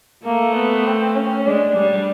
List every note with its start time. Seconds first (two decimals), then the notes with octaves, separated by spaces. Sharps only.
0.25 A3 A#3
0.55 B3
0.86 C4
1.15 C#4
1.46 G#3 D4
1.77 G3